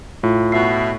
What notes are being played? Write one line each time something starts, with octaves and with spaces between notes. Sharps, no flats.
A2 F4
B2 E5 C7